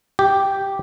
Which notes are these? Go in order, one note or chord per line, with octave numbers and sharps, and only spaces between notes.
G4